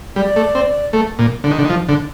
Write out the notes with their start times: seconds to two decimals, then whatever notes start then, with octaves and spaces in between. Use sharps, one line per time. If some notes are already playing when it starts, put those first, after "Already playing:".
0.16 G3 D5
0.36 A3
0.55 C4
0.93 A3
1.19 A#2
1.44 D3
1.51 D#3
1.58 D3
1.65 D#3
1.69 F3
1.89 D3